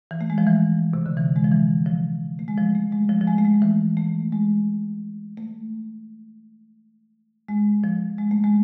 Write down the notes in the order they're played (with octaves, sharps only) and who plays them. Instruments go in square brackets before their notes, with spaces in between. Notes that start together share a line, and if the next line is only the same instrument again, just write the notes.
[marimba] E3
A3
G#3
F3
E3
C3
D3
E3
G#3
F3
E3
F3
A3
G#3
F3
A3
G#3
F3
F3
G#3
A3
G#3
E3
A3
G#3
A3
G#3
F3
G#3
A3
G#3